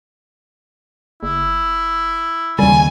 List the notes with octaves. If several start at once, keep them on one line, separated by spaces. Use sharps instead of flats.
F#1 E4
D#2 C#3 G3 G#5